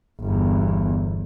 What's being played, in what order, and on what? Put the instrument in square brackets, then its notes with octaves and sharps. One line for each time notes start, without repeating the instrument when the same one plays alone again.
[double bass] G1 E2